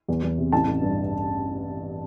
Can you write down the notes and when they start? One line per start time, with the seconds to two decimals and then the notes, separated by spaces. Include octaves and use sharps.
0.08 E2
0.23 E2
0.38 C3
0.52 A1 A5
0.67 A1
0.82 G2